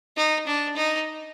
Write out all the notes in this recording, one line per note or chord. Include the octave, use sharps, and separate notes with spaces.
D#4
D4
D#4